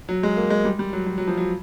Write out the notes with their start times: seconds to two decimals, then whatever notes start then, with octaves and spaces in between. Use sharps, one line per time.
0.09 F#3
0.23 G#3
0.37 A#3
0.50 G#3
0.65 G3
0.79 G3
0.93 F#3
1.07 F#3
1.18 F#3
1.27 F3
1.37 F#3